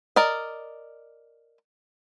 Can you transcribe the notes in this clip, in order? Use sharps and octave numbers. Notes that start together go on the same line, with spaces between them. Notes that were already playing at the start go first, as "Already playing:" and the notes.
A#4 D5 D#5